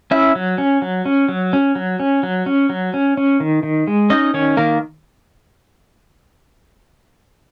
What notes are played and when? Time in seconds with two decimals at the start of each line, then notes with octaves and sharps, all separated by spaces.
0.11 C#4 E4 E5
0.35 F#3
0.58 C#4
0.82 F#3
1.06 C#4
1.29 F#3
1.53 C#4
1.75 F#3
2.00 C#4
2.23 F#3
2.46 C#4
2.69 F#3
2.94 C#4
3.17 C#4
3.40 D#3
3.63 D#3
3.87 G#3
4.10 C#4 D#4 D#5
4.34 D#3 C#4 C#5
4.57 D#3 A#3 A#4